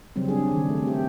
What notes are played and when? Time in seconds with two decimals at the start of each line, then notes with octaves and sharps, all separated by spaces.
0.16 C#3 F#3 G3 C4
0.28 D4 G#4
0.52 D#3
0.69 A3
0.83 C4 G4